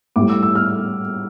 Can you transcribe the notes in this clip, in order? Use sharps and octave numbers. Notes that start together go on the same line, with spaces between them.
A2 G3 D6
E6
E6
F6